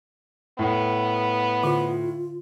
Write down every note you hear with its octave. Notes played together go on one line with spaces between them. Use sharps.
A2 B3
D3 F4